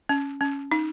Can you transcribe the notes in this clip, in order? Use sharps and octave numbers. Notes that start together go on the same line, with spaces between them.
C#4
C#4
D#4